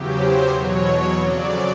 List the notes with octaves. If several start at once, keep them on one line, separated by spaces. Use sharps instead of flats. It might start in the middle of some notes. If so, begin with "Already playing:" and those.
Already playing: E2 C#3 F#3 G4
C5
E2 B2 F#3 C#5
F2 C#3 F#3 D5